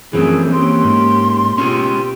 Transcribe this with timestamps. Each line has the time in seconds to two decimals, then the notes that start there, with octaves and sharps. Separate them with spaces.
0.13 F#2 E3 F3 A3 C4 G#4
0.53 A#3 C#4 G4 C6
0.84 G#2
1.58 B2 C#4 F4 G4 G#4